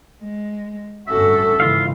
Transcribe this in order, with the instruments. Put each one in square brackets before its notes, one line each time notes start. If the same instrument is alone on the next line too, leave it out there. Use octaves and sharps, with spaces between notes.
[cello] G#3
[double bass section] G1 A2 C#4 [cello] F#4 A4 [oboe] E5
[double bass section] D#2 G#2 C#3 [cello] E3 [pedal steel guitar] F4 F5